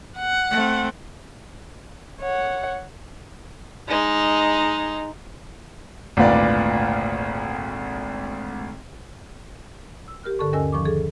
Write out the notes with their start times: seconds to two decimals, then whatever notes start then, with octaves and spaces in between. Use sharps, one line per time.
0.18 F#5
0.52 A3 C4
2.21 C#5 F#5
3.88 G#3 D#4
6.17 G#1 D2 A#2 F4 B4 D5
10.08 E6
10.23 G4 A#4 F6 F#6
10.39 G2 D3 A4 A5 C#6
10.53 D#2 C#4 A#4 D#5 G#5 E6
10.72 D#3 F3 C#6 D6
10.85 G#4 A4